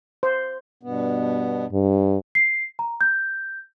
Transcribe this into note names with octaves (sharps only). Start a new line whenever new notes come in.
C5
G2 B2 B3
G2
C7
A#5
G6